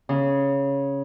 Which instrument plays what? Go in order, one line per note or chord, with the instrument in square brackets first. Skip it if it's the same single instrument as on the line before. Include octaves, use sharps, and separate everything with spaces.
[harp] C#3